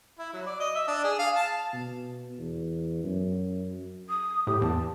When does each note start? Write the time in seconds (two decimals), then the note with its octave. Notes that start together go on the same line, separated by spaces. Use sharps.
0.19 E4
0.33 F#3
0.47 D5
0.60 D#5
0.75 E5
0.88 D4
1.04 G#4
1.19 F5
1.36 A5
1.74 B2
2.39 E2
3.04 F#2
4.09 D#6
4.47 A2 G4
4.62 E2 A5